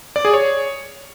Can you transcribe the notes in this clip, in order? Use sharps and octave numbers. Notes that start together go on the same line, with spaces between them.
D5
G#4
C#5